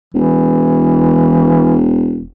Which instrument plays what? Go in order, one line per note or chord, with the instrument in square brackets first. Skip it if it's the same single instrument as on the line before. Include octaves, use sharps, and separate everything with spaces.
[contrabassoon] E1 [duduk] E3